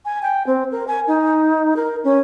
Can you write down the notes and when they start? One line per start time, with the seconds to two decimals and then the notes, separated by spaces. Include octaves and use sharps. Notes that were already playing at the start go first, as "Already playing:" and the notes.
0.05 G#5
0.22 G5
0.47 C4
0.72 A#4
0.88 G#5
1.08 D#4
1.76 A#4
2.04 C#4